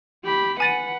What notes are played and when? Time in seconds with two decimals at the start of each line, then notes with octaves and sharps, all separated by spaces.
0.24 G4 B5
0.60 B4 F#5 G#5 A6 D#7